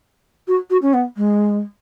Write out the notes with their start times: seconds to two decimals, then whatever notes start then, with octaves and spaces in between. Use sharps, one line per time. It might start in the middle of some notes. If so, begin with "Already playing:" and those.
0.47 F#4
0.70 F#4
0.82 C#4
0.93 B3
1.16 G#3